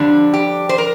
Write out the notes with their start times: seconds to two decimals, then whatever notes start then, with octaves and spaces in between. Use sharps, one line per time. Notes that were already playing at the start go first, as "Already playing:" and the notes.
Already playing: F2 D3 G3 D4
0.34 G4
0.69 C5
0.78 A#4